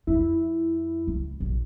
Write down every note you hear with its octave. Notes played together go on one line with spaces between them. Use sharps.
F2 E4
C#2
A#1